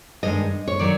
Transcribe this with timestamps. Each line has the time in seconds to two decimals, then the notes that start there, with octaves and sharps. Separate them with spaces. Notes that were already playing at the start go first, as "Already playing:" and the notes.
0.23 G2 D#3 G#3 D#5
0.68 C#5
0.79 D#3 F#3 D5